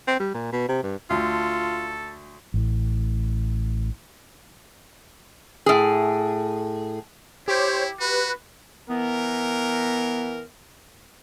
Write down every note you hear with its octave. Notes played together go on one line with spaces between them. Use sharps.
C4
G3
A#2
B2
C3
G2
D2 F4 A4
A1 A2
A2 G#4
E4 G4 C5 C#5
F#4 B4
E3 B3 A#4